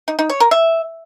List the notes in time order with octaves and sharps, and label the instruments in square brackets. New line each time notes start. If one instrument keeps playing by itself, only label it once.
[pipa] D#4
D#4
C#5
A#4
E5